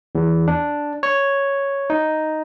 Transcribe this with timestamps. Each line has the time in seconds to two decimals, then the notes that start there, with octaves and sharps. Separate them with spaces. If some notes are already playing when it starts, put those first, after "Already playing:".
0.15 E2
0.48 D4
1.03 C#5
1.90 D#4